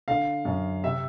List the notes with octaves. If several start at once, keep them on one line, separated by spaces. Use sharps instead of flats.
D3 F5
F#2
C3 E5